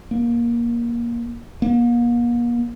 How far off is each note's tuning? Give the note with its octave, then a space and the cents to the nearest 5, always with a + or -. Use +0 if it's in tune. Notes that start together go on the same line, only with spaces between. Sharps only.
A#3 +20
A#3 +40